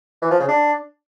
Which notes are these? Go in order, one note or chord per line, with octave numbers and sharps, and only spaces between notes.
E3
F3
C#3
D4